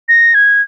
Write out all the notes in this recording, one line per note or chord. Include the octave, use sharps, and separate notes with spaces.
A#6
G#6